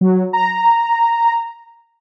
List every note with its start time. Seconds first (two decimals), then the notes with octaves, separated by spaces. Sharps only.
0.01 F#3
0.33 A#5